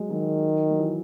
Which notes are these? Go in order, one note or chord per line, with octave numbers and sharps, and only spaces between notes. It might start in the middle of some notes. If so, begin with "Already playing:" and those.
Already playing: F#3 G#3
D#3 F#3
F#3
E3